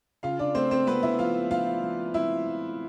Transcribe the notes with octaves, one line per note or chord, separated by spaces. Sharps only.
C#3 F4 F5
D4 D5
A3 C4 C5
C4 C5
B3 C4 B4
E4 E5
F3 F4 F5
F3 F4 F5
F3
C4 E4 E5
F3